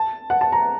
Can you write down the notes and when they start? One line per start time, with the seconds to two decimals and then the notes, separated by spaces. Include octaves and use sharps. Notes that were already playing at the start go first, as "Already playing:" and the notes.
Already playing: A5
0.30 F#5
0.41 A5
0.52 A#5